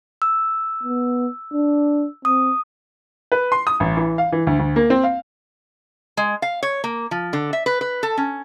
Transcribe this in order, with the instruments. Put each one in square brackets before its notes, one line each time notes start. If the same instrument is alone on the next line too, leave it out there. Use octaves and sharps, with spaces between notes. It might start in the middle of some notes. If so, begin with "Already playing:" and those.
[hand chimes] E6
[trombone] B3
D4
[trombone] C4 [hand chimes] D#6
[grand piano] B4
C6
D#6
A1
E3
F5
E3
D2
D2
A#3
C4
F5
[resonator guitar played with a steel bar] G#3
F5
C#5
A#3
F3
D3
E5
B4
B4
A4
C#4